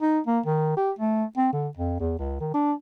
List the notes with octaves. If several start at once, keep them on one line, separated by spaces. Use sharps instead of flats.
D#4
A#3
D#3
G4
A3
C4
D3
F2
E2
C#2
D#3
D4